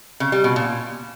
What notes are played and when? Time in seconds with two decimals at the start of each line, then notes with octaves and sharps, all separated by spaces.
0.20 C#3
0.32 G3
0.44 B2
0.56 A#2